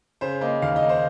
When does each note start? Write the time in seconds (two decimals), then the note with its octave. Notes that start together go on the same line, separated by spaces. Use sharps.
0.21 C#3 C5
0.41 A#3 D#5
0.62 D#2 F5
0.76 D#5
0.82 A#3
0.89 C5